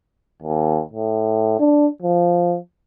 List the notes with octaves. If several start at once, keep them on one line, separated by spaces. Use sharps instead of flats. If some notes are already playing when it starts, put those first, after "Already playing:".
D#2
A2
D4
F3